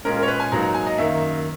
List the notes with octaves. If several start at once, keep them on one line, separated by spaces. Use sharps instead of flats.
A#2 G#3 C#4 A#4
A#4
C#5
B4
G#5
G#2 F#3 A#3 D#4 A#5
A#5
G#5
D#5
F#2 D#3 A#3 E5